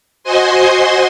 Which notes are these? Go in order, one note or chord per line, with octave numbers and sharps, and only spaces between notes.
F#4 C5 D#5 G#5 C6